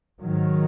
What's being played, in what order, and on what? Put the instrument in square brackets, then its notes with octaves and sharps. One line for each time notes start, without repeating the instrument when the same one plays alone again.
[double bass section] G#2 D#3 F#3